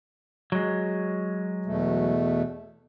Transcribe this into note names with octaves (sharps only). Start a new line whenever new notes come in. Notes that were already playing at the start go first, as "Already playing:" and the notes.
F#3 G#3
E2 B2 A3